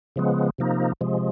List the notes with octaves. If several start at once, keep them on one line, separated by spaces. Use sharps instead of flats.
C#3 F3 G#3 B3
C3 F3 A#3 D#4
C3 F3 G#3